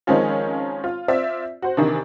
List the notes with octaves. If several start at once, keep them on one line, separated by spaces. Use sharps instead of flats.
D#3 F3 G#3 C4 C#4 F4
F4
C4 F4 D5 E5
F#4 C5
C3 D#3 E3 D4